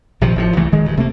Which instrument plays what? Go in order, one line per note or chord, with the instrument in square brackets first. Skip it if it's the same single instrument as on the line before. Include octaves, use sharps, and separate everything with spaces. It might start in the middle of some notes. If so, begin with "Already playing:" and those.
[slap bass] A#1 C3 D#3 F3
G#1 A2 F3
C2 E3 A3
D1 D#3 G#3
D1 G2
C3 A3 A#3